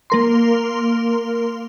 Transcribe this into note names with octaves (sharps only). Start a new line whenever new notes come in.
A#3 A#4 C6